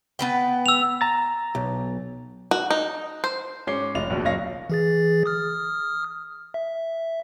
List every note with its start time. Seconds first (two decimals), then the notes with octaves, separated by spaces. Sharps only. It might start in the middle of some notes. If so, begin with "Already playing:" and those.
0.19 B3 B4 G5
0.66 E6 F7
1.01 A#5 A6
1.55 B1
2.51 F#4
2.70 D#4
3.24 C5
3.67 G#2 C#4 D6 C7 G7
3.95 F1 F4 D#5 F7
4.10 A#1 D#2 B2
4.24 F#1 A#2 C#5 D#5 F5 A#6
4.70 E3 G#4 A6
5.26 D#6 F6
6.54 E5